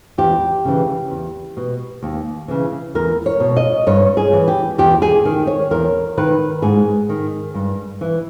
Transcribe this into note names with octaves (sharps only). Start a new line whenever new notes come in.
E2 G4
C#3 E3
E2
B2
D#2
C#3 E3
E2 A#4
C#5
B2
D#5
G2 C#5
G#4
E3
G4
E2 G4
G#4
D#3
C#5
E2 A#4
D#3 B4
G#2 G#4
D#3
G2
E3